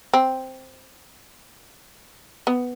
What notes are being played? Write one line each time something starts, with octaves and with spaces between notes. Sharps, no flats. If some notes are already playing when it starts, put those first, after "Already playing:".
C4
B3